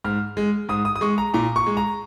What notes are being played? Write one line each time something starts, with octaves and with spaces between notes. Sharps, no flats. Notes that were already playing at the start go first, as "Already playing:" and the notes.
G#2 F6
G#3
G#2 D#6
D#6
D#6
G#3 C#6
A#5
A#2 A#5
C#6
G#3
A#5